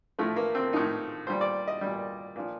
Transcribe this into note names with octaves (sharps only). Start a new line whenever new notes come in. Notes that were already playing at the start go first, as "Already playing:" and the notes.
A2 F3 A3
A#3
C4
A2 F3 D#4
A#2 G3 C5
D5
D#5
A#2 G3
A#2 F3